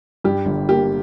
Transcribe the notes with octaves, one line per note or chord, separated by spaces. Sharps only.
G2 G4
G1
A#3 G4